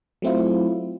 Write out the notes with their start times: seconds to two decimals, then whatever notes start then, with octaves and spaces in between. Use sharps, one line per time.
0.22 F#3 A3 C4 E4 F4